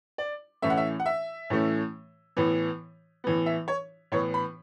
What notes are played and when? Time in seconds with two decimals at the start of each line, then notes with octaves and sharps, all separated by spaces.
0.18 D5
0.62 A2 E3 A3 C#4 E5
0.70 F#5
0.77 E5
1.00 F#5
1.06 E5
1.50 A2 E3 A3 C#4
2.37 A2 E3 B3
3.24 A2 E3 B3
3.46 E5
3.68 C#5
4.12 A2 E3 B3 C#5
4.34 B5